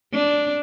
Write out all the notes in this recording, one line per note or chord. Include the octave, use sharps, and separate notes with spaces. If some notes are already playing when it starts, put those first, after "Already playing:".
D4